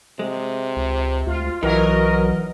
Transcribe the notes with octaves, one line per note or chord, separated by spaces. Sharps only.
C3 G#3
C#2
D2 F4
B1 E3 F#3 A#4 D#5